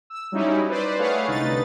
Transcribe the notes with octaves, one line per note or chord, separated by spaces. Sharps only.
E6
F#3 G3 C#4 D#4 E4
B4 C5 D5
A3 G#4 B4 C#5 F5 F#5
C2 D3 D#4 B4 A6